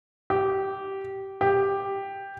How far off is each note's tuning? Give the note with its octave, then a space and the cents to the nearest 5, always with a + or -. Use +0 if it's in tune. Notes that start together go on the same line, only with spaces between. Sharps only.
G4 -15
G4 +5